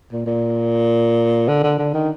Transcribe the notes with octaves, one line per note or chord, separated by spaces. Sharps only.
A#2
A#2
D3
D3
D3
D#3